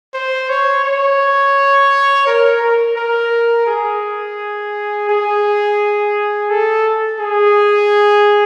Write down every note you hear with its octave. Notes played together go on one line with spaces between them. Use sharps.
C5
C#5
C#5
A#4
A#4
A#4
G#4
G#4
A4
G#4